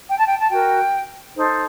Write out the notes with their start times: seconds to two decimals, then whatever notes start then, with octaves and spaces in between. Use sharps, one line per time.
0.09 G5
0.18 A5
0.27 G5
0.40 A5
0.50 F#4 A#4 G5
1.35 D#4 A4 C5